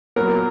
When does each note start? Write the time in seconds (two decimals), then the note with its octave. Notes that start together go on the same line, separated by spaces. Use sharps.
0.16 A#2 F#3 B3 A#4